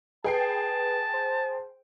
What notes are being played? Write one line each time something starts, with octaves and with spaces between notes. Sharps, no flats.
G#4 B4 G5 A5 C7
C5